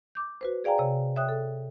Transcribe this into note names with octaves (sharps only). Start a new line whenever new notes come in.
D6 G6
F#4 B4 C5
G#4 D5 F5 G5 G#5 A#5
C3 C#5
C#5 E5 G5 D#6 F#6
A4